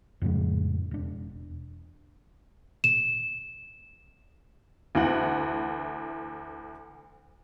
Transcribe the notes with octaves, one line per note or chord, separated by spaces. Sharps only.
F2 A2 C#3 G#3
E1 D4
E7
D2 E3 F#5